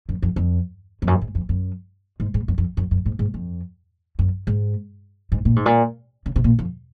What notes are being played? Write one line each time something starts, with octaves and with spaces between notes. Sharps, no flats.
F#2
F2
F2
F2
F#2
G#2
F2
F#2
G#2
G#2
F#2
F2
F#2
F#2
G#2
G#2
F2
F#2
G#2
G#2
A#2
G#2
A#2
C#3
C3
A#2
F2